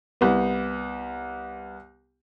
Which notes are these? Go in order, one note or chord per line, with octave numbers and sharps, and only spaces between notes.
C2 B3